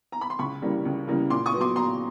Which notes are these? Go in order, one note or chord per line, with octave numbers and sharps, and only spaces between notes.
A#5
B5
C6
C#2 B5 C#6
C#3 E3 G3 A#3
C#2
C#3 E3 G3 A#3
A#2 C6 D6
C#6 D#6
F#3 B3
C6 D6
A#2 A#5 C6